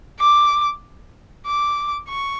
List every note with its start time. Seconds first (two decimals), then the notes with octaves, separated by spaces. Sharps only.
0.20 D6
1.47 D6
2.09 C#6